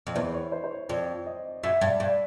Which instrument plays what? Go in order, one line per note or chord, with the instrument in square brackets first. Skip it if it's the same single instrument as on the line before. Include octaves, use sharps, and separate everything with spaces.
[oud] F2
[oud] E2 [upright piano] C5
[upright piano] C#5
C5
C5
C#5
[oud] F2 [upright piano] D5
[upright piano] D#5
[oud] F#2 [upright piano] E5
[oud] G2
G2